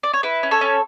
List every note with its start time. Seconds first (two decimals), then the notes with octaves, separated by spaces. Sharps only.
0.03 D5
0.13 C#5
0.23 E4 B4
0.43 C#4
0.51 A4 C#5
0.61 C#4